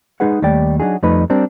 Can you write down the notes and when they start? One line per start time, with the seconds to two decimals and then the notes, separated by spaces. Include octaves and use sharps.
0.20 G#3 D#4 G#4 B4 F#5
0.42 D#2 G3 A3 D5 G5
0.80 F#3 A3 D4 D#4 F#4 G#4
1.03 F2 G3 A3 D#4 B4
1.30 G3 C4 D4 A#4